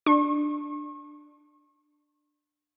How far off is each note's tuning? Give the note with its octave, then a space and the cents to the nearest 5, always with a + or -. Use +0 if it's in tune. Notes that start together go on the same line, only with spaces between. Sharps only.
D4 +10 C#6 -40